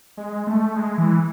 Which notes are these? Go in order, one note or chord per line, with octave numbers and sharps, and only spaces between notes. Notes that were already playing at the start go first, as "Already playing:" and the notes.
G#3
A3
G#3
E3